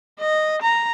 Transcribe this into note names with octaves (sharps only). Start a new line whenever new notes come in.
D#5
A#5